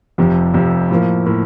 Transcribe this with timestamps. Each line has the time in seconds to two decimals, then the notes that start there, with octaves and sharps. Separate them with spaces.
0.18 F1 F2 C3 F3
0.54 F1 F2 C3 F3
0.90 A2 F3 A#3
1.26 A2 F3 A#3